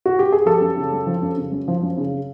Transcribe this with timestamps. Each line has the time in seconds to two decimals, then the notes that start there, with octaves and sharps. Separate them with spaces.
0.06 F#4
0.19 G4
0.32 G#4
0.46 F3 G4 A4
0.61 F#2
0.77 C#3
0.92 F#2
1.07 F3
1.22 F#2
1.37 C#3
1.52 F#2
1.68 F3
1.82 F#2
1.97 C#3